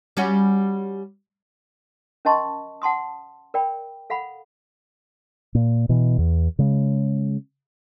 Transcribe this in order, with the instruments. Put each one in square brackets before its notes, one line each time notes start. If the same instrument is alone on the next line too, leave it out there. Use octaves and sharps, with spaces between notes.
[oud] G3 C#4 F#4
[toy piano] C#4 A#4 D#5 A5 C6 C#6
F#5 A5 C6 D#6
A#4 D5 G5 B5
A4 F5 F#5 B5
[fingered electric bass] A#2
B2 E3
E2
C#3 G#3